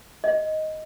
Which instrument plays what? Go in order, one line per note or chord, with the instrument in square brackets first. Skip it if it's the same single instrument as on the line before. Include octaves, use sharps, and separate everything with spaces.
[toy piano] D#5